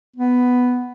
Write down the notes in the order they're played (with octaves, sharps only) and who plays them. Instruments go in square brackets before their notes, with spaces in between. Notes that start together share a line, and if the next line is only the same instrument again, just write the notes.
[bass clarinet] B3